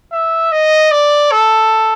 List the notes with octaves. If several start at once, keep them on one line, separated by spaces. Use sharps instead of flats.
E5
D#5
D5
A4